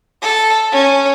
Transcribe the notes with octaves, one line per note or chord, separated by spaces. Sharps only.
A4
C#4